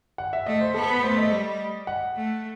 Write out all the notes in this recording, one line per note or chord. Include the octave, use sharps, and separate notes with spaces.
F#5
E5
A3 D#5
C5
B3 A4
B4
A3 C5
D#5
G3
F#5
A3